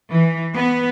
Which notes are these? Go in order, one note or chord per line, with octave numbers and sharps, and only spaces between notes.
E3
B3